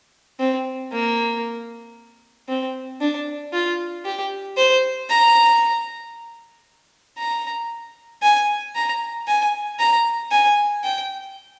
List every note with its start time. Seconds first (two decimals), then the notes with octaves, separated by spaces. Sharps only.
0.40 C4
0.92 A#3
2.49 C4
3.01 D4
3.53 F4
4.05 G4
4.57 C5
5.09 A#5
7.18 A#5
8.22 G#5
8.75 A#5
9.28 G#5
9.79 A#5
10.32 G#5
10.84 G5